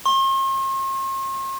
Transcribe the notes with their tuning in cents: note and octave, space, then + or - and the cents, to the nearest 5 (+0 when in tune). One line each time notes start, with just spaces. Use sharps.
C6 +45